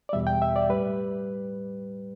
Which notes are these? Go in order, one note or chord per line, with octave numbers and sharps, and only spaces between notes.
D5
E2 B2 G3 E5
G5
E5
D5
A2 G3 B4